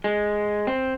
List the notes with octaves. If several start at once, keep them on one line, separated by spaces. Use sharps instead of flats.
G#3
C4